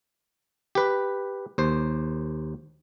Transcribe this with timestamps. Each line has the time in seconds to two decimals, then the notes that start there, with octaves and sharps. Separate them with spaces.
0.75 G4 B4
1.58 D#2 C5